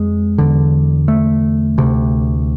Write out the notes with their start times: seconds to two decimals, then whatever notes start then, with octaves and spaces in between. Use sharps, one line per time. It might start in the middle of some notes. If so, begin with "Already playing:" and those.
Already playing: F2 G#3
0.38 E2 D3
1.08 A3
1.78 D2 C3